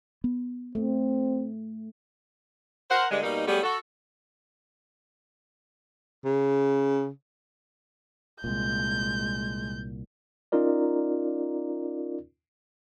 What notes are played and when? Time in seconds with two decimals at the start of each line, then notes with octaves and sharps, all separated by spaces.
0.24 B3
0.75 A3 C4
2.91 A#4 C5 F#5
3.11 G2 D3 G3 G#3
3.23 B2 G3 A#3 D#4
3.48 F#3 G3 A3 B3 G4 G#4
3.63 F#4 A4
6.25 C#3
8.44 C2 A#2 G#3 G6
10.52 C#4 D#4 F4 A#4 D5